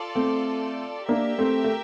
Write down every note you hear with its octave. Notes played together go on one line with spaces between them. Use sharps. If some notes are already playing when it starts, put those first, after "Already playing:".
Already playing: F4 A4 D5
A3 C4
A#3 D4 G4 A#4 E5 G5
A3 C4
A3